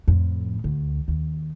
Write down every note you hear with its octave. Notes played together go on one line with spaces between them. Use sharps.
F2 A2
D2
D#2